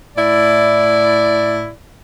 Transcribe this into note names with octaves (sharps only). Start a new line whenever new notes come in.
A2 E4 D5